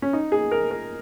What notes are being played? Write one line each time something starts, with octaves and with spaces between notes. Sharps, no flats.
C#4
D#4
G#4
A#4
A#4